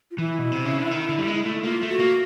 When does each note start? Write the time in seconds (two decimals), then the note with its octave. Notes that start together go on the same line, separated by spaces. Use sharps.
0.11 F4
0.18 E3 E4
0.39 B2
0.52 C3
0.65 C#3
0.78 D3
0.91 D#3
1.09 D3
1.18 G3
1.27 G#3
1.45 A3
1.63 A#3 F4
1.82 A3
1.88 F#4
1.99 A#3